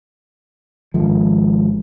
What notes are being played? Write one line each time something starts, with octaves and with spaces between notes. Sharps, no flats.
G#1 F3